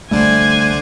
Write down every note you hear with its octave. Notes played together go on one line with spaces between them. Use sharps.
C2 D3 G3 A3 D4 C5 G#5